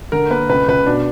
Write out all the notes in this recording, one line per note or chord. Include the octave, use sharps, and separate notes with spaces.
D3 A#4
A#3 B4
C#2 B4
C#2 B4
B2 D4